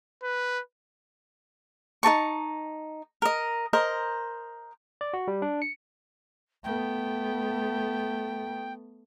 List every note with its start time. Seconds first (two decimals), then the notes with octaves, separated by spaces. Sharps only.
0.23 B4
2.03 D#4 A#4 A5 C#6
3.22 A#4 D#5
3.73 A#4 C5 D#5
5.01 D5
5.13 F#4
5.28 G3
5.42 D4
5.62 C#7
6.64 A3 B3 G5